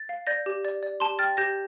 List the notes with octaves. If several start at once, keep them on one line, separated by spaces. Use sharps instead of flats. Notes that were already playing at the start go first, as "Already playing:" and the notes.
Already playing: A6
F5
D5 G6 A#6
G4
D5
D5
G4 A5 C6
G5 F6 A6
G4 G6 A#6